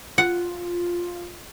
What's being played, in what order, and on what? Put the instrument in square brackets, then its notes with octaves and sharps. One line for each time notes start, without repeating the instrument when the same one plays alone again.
[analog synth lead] F4 [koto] F#5